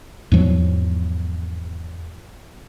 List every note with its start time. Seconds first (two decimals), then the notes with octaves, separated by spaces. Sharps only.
0.32 E2 G#2 F3 F#3